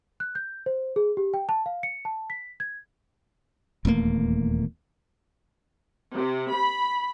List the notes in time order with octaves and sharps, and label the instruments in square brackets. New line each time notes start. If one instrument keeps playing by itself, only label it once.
[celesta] F#6
G6
C5
G#4
G4
G5
A5
F5
C#7
A5
B6
G#6
[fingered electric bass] D#1 E2 A3 A#3
[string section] C3
B5